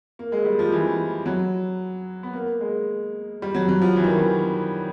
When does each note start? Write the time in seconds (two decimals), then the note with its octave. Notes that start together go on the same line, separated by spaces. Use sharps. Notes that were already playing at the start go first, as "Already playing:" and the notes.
0.19 A#3
0.32 G#3
0.45 G3
0.59 F3
0.72 E3
1.26 F#3
2.23 B3
2.33 A#3
2.61 G#3
3.42 G3
3.55 F#3
3.69 F#3
3.81 F3
3.96 E3
4.04 D#3
4.12 E3